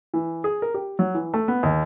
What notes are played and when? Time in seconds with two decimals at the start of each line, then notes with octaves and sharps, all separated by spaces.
0.14 E3
0.44 G#4
0.62 A#4
0.74 G4
0.99 F#3
1.14 E3
1.34 A3
1.48 B3
1.63 D#2